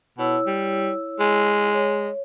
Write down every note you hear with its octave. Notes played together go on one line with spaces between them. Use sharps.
B2 E4 C#5 E6
G3
G#3
C#5